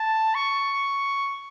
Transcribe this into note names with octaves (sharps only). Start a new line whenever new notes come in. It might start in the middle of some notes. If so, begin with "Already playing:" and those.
Already playing: A5
C#6